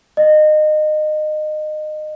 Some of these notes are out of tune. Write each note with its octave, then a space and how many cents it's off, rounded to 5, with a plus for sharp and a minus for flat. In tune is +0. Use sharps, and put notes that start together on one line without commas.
D#5 -25